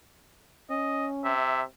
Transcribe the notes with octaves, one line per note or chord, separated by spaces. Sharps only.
C#4 D#5
C3 E5